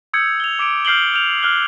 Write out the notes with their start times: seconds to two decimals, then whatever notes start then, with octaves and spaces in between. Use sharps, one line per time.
0.14 D#6 E6 G6 G#6 C#7
0.40 F7 G7
0.59 D6 C#7 D7
0.85 F6 G6 C7 D7 F#7 G7
1.14 F6 G6 F7
1.43 F6 F#6 G7